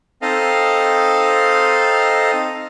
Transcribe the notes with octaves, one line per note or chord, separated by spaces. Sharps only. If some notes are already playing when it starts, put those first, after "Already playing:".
C4 D#4 A4 D#5 F5